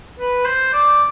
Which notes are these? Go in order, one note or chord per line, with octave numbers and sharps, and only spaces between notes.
B4
C5
D5